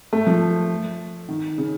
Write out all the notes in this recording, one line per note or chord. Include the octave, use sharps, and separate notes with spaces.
A3
F3
D#3
C#3